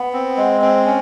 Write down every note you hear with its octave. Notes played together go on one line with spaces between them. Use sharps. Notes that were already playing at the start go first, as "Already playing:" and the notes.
Already playing: B3
C4
G#3
C4
C#4